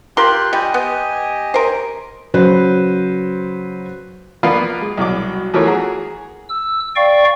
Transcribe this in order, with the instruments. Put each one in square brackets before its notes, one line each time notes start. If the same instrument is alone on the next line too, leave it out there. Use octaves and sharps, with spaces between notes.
[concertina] F4 G4 F#6 [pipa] A#4 C6
[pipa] G3 [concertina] G4 D#5 G#5
[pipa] B3
A#4 C5
[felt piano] C#3 F#3 B4 C5
[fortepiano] F3 A#3 B3 F4 B4 D5
G#3
C2 B2 F#3 D6
E3 F3 A3 A#4 C#5
F#4 G#4 A#5
[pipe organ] E6
D5 F5 G5 C#6